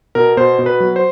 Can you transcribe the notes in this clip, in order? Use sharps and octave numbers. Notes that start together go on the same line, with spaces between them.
B2 A#4
B2 C5
B2
B4
F#3
C5